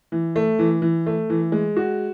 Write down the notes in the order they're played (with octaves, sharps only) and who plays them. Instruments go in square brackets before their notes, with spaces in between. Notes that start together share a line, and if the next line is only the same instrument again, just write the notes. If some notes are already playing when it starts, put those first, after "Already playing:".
[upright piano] E3
A3
E3
E3
A3
E3
G#3
F#4